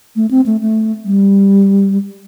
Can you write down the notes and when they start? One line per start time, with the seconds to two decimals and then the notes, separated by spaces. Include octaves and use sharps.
0.16 A3
0.31 C4
0.46 A3
0.61 A3
1.05 G3